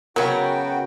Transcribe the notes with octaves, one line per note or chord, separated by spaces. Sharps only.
C#3 F#3 B3 F#4 A#4 G5